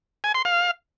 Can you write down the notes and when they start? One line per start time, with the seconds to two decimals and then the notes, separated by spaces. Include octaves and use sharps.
0.24 G#5
0.34 C6
0.45 F5